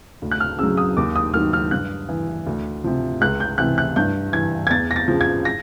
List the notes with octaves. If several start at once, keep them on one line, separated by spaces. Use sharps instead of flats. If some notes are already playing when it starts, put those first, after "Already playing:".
D2
F#6
F6
C#3 F#3 E6
D#6
D#2 D6
D#6
D#3 F#3 F6
F6
G2 F#6
E3
D2
C3 F3
C#2 F#6
G6
C3 E3 F#6
F#6
G2 G6
E3 G#6
G#6
E2 A6
A#6
A6
C#3 F3
G#6
A#6